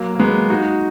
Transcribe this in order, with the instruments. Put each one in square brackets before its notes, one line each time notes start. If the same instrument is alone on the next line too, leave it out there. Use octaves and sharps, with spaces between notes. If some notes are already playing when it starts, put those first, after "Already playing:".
Already playing: [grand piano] F#3 A#3
A#3
G#3 B3
D#4 F#4